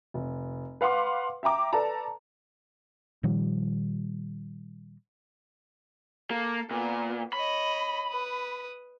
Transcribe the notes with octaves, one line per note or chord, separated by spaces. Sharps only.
F1
B4 F5 F#5 C6 D6
E5 G5 A#5 D6
A4 B4 D5 A5 A#5
A#2 D#3 F3 G3
A#3 A4
A#2 B3
C#5 D#5 B5
B4 D#6